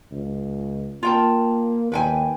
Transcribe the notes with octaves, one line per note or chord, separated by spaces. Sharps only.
C#2
A#3 F4 G5 A5
D#2 B4 G5 G#5